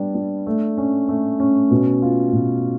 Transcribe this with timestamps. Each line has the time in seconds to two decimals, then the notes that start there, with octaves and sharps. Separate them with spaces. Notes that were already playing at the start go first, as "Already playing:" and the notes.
Already playing: G3 B3 D4
0.15 D4
0.47 A3
0.78 C#4
1.09 A3
1.40 C#4
1.71 B2
2.02 F4
2.33 B2